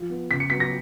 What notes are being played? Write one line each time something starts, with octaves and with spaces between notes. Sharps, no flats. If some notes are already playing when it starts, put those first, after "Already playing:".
Already playing: F3
B3
C#3 B6
C#7
F#3 B3 B6
A#6